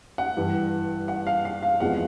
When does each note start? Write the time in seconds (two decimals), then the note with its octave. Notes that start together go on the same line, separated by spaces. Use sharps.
0.18 F#5
0.37 G2 E3 G3
1.08 F#5
1.27 F5
1.45 F5
1.63 F5
1.80 E2 C3 F3 G#3 F#5